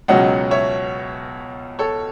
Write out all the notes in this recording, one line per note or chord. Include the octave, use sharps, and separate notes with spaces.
C#2 B2 F#3 C#4 D#5 F#5
C#5 E5
A4 C#5